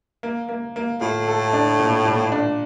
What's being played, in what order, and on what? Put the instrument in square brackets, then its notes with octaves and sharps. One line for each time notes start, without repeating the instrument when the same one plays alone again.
[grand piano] A#3
A#3
A#3
[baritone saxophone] A2 [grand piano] F4
[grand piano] A4
D4
A#2
A#2
D4